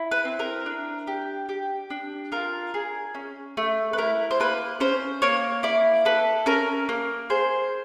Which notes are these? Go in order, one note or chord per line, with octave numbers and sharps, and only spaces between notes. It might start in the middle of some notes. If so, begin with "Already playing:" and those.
Already playing: E4
B4
C4
A#4
D4
G4
G4
D4
F4 A#4
G#4
C#4
A3
B4
E4 A#4
C5
A#3 B4
C#4 C5
A#3 C#5
E4 D5
A4 B4
C#4 A#4
A#3
G#4 C5